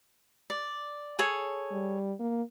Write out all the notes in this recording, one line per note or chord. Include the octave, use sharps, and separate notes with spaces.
D5
G#4 A4 C#5
G3
A#3